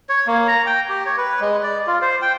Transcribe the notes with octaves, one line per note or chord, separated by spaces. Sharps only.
C#5
A#3
A#5
G5
G4
C#5
B4
G#3
D5
F4
C5
G5